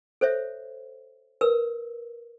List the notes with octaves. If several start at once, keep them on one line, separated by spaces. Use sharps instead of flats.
A4 C5 C#5 E5
A#4 B4 E6